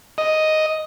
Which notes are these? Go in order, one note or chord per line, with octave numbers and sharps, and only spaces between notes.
D#5